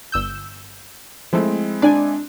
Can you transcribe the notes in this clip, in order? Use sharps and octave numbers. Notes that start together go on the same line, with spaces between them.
G1 E6 G6
F3 G#3 A3 C4 E4
D4 D5 G#5